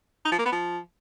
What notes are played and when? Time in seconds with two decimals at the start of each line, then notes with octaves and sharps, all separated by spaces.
0.25 D#4
0.32 F3
0.39 A#3
0.45 B3
0.52 F3